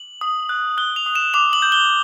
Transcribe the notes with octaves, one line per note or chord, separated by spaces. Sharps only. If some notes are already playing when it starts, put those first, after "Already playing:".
Already playing: F#7
D#6
F#6
F#6 G7
F7
D#6
E7
D6 F7
F#7
G6
G7